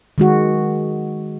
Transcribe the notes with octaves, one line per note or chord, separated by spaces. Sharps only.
D#3 G#3 F#4